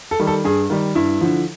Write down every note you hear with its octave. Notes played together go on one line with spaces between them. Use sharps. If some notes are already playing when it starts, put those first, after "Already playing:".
A4
D#3 G3
A4
G2 G#4
D#3 G3
G2 E4
D3 F3